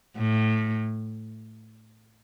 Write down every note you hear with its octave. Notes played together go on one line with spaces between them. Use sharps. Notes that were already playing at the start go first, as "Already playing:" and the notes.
A2